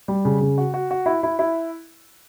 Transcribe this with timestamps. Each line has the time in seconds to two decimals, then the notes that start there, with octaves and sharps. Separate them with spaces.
0.08 G3
0.25 C#3
0.41 C#3
0.58 F#4
0.74 F#4
0.91 F#4
1.06 E4
1.23 E4
1.39 E4